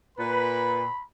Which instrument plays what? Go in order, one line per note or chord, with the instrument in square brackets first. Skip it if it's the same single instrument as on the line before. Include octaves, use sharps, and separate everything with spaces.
[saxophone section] A#2 B4 [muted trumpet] B5